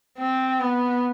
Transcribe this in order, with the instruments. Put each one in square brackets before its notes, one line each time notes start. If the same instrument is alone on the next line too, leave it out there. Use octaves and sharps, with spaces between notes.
[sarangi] C4
B3